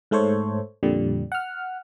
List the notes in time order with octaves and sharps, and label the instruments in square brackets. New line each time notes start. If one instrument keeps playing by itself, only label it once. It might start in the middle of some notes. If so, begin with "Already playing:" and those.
[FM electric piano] G#2 A3 A4 C5 C#5
F2 A#2 D3 G3
F#5 F6